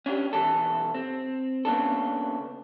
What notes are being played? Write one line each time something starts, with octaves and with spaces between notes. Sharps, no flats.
C#4 D4 E4 G4
B1 E3 G4 A4
C4
C#3 A#3 B3 D4 A4